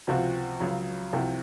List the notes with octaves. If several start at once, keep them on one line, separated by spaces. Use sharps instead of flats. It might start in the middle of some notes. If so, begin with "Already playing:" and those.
C#2 C3 F3 C4 F#4
C#2 C#3 F#3
C2 C3 F3 C4 F#4